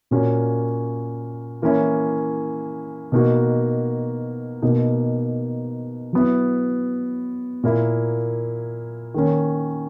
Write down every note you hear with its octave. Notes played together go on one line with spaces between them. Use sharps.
A#2 A#3 C#4 F#4
E3 A#3 C#4 E4
B2 A#3 D#4 F#4
B2 A#3 D#4
F#3 B3 E4
A#2 A#3 E4
D#3 A#3 C#4